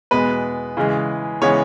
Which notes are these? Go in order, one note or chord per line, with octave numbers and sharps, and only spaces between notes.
E2 B2 G#3 B3 B4
C#3 E3 G#3
C#3 E3 G#3 B3 C#5